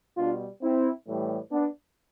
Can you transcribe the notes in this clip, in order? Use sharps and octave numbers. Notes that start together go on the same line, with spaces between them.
B2 G3 D4 F4
C4 E4
A2 E3 G3
B3 D4